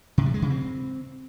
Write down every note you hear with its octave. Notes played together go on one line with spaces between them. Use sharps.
C3
G3
G#3
C#3
C4